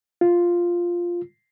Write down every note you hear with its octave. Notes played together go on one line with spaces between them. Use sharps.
F4